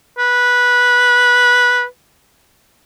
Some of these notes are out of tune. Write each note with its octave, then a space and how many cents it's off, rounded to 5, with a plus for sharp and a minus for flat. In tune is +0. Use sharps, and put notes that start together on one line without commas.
B4 -10